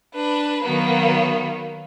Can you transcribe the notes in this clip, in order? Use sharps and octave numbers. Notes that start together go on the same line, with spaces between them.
D4 B4
D#3 F#3 A#3 B3